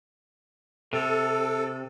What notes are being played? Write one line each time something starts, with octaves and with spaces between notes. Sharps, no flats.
C3 A4